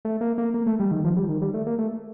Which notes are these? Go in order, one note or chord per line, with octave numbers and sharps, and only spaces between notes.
A3
A#3
A#3
A#3
A3
G3
D#3
F3
G3
D#3
G3
A3
A#3
A3